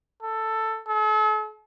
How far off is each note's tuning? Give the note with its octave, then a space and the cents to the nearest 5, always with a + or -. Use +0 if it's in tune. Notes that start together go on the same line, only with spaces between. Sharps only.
A4 +10
A4 -45